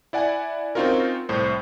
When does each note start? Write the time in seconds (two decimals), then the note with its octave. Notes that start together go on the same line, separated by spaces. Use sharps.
0.13 E4 D5 F#5 G#5
0.75 C4 C#4 D#4 F4 F#4 A#4
1.29 C2 A2 C5